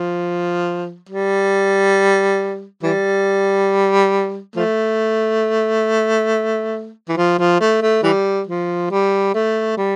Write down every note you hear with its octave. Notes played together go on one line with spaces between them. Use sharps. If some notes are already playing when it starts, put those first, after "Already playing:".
Already playing: F3
G3
E3 G3
F3 A3
E3
F3
F3
A3
A3
E3 G3
F3
G3
A3
G3